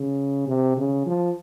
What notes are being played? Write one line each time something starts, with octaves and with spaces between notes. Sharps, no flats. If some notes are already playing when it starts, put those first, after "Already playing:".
Already playing: C#3
C3
C#3
F3